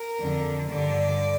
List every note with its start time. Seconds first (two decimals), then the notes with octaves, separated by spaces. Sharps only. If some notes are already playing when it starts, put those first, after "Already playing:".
Already playing: A#4
0.20 F2 D3
0.71 G2 D3 D5